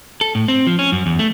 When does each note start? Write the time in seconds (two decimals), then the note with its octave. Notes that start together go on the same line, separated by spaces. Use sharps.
0.21 A4
0.35 A2
0.48 C4
0.67 F3
0.79 C#4
0.92 F#2
1.06 E2
1.19 A3